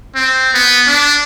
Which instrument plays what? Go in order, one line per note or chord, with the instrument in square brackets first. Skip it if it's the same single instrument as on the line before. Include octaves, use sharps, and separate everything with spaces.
[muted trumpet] C4
B3
D4